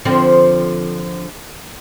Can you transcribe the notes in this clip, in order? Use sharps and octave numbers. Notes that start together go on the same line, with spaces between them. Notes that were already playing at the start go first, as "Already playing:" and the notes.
D3 F3 C4